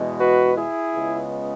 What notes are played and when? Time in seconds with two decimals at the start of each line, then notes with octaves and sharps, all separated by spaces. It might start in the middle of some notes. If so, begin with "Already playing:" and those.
Already playing: E2 B2 G#3
0.20 F#4 B4
0.57 E4 G#4
0.94 C#2 C#3 G#3 B3